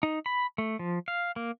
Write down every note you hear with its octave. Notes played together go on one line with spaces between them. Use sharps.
D#4
B5
A3
F3
F5
A#3